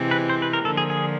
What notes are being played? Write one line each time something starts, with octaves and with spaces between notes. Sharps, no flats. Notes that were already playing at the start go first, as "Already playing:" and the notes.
Already playing: C3 E3 G#3 C4
B4
C5
B4
A#4
D3 F3 A#3 A4
G#4
G#4